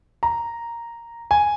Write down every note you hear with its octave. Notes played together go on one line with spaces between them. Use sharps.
A#5
G#5